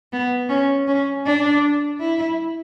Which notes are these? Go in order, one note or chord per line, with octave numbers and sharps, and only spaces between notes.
B3
C#4
C#4
D4
E4